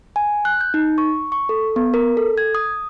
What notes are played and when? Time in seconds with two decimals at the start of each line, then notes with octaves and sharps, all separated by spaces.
0.16 G#5
0.45 F#6
0.61 G6
0.74 D#4
0.98 C#6
1.32 C#6
1.49 A4
1.76 B3
1.94 A#4
2.17 A4
2.38 G#6
2.55 D#6